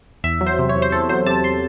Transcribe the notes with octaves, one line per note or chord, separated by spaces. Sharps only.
E2 E5
F#3
C5
C3
C#5
E2
C5
E2 A4
F#3 C5
C3 A5
C6